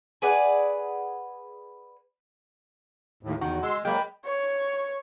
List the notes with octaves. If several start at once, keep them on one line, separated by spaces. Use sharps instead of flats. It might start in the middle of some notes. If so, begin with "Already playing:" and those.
G#4 B4 D5 F#5
D#2 A2
E2 D#3 F#4
G#3 C6 E6
F#3 G#3 A#3 G5 B5
C#5